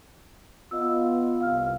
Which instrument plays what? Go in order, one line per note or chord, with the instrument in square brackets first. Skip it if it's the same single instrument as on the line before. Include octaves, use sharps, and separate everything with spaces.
[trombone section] B3 F4 [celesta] D#5 E6
[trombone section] C2 [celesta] F5 F6